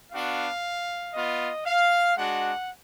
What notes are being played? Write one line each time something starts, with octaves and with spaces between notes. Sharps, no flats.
B3 D4 F#4 F5
B3 F4 D#5
F5
G#3 D4 F#4 F#5